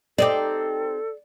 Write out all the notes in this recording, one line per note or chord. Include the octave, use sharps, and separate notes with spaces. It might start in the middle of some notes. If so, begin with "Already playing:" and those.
C4 D#4 G4 A4 D5